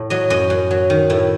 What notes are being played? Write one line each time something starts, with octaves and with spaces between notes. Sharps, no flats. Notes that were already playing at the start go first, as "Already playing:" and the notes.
Already playing: A2
F#3 D#5
F#2 D#5
F#2
F#3
D#3
A2 E4